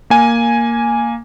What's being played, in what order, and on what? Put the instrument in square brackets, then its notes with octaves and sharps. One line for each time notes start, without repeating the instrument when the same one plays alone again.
[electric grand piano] A#3 G#5